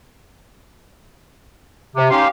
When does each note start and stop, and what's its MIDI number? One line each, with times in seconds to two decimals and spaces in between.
1.96 2.11 48
2.11 2.24 61
2.11 2.24 63
2.11 2.28 67
2.11 2.28 77
2.11 2.24 84